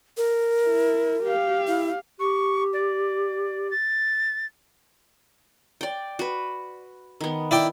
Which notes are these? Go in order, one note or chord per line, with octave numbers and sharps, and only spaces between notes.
A#4
E4
G4 F5
E4
G4 C#6
D5
A6
D5 G5
F#4 B4
D#3 B3
E4 D5 G5